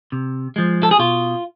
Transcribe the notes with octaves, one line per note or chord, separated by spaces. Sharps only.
C3
F3 G#3
A4
G#4
B2 F4